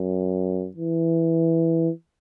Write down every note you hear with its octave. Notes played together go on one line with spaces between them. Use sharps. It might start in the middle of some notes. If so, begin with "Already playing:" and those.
Already playing: F#2
E3